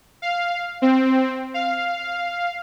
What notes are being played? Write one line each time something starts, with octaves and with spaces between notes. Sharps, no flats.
F5
C4
F5